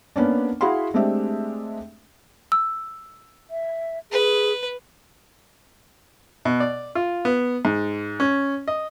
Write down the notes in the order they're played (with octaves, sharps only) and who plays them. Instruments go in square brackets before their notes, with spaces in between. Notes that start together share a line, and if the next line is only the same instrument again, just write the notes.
[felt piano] A#3 B3 C#4 D4
E4 F#4 G#4 F5 B5 C6
G#3 A3 C4 D4 G4 E5
[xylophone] E6
[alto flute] E5
[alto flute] G#4 [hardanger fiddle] B4
[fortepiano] B2
D5
F4
B3
G#2
C#4
D#5